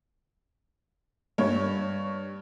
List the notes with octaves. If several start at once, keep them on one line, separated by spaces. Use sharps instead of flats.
G2 C#5